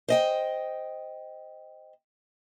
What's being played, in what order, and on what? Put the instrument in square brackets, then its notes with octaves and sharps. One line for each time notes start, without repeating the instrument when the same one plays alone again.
[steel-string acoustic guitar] C5 D#5 G5